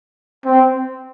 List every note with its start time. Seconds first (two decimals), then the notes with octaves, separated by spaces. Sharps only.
0.45 C4